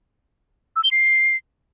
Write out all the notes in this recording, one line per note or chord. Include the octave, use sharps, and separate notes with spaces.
E6
G7
C7